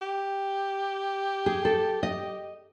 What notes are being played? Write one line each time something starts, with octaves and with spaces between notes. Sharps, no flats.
G4
G#4
A4
D#5